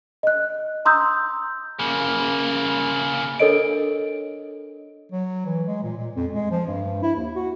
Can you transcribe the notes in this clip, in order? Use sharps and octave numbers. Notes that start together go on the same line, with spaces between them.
D#5 F#6
A#5 C6 D#6 E6 G6
C#3 A#3
D4 A4 A#4 C#5 D#5 D7
F#3
E3
G#3
A#2
A#2
F2
G#3
F3
G2
E4
D#2
F#4